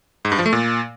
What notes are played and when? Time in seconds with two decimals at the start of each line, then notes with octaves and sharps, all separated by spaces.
0.25 G#2
0.32 G2
0.39 F3
0.46 A3
0.53 A#2